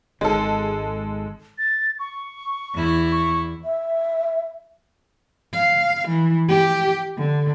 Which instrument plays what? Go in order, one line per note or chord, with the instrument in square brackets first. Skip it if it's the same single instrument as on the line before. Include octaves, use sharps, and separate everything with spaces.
[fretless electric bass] G#1 G#2 D#3 [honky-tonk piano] G#3 A4
[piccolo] A6
C#6
[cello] E2 E4
[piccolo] C#6
[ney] E5
[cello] F5
E3
G4
D3